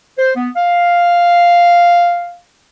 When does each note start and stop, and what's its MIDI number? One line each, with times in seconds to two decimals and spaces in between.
0.18 0.31 72
0.35 0.49 59
0.56 2.38 77